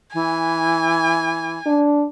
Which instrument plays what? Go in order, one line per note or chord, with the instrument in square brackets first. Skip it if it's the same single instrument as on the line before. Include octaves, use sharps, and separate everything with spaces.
[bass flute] E3 [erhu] G#5
[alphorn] D4